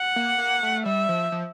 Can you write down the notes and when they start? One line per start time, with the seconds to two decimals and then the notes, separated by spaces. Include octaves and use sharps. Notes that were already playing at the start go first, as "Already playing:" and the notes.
Already playing: F#5
0.16 A#3
0.38 A#3
0.63 A3
0.86 G3 E5
1.09 F3
1.32 F3